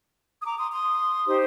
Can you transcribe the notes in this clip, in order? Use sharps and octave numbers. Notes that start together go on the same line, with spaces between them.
D#6
A#5 D6
C6 D#6
C6 D#6
D#4 G4 C5